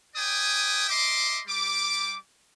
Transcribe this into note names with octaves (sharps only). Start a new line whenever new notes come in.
B4 D5 G5 G#5 D#6
D#5 E5 C6 D6
G3 D6